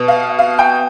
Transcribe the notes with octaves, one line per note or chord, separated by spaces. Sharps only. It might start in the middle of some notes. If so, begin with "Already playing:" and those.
Already playing: B2 B3
F5
F5
G5